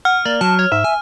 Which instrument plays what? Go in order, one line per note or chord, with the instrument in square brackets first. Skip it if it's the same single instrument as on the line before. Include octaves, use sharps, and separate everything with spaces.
[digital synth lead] F#5 [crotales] F6
[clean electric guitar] A#3 [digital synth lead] D5
[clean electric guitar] F#3 [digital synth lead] A5
[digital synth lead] C#5
[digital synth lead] G#2 [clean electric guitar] E5
[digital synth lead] G#5